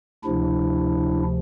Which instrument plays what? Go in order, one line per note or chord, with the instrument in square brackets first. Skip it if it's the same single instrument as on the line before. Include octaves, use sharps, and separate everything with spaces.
[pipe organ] D2 C3 F3 D4 E4